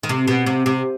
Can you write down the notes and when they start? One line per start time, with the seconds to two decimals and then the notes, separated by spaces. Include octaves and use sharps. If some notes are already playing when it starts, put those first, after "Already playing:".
0.03 D#3
0.09 C3
0.28 B2
0.46 C3
0.66 C3